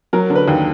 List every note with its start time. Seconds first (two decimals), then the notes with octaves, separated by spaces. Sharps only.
0.13 F#3 A#4
0.30 D3
0.35 B4
0.48 D#2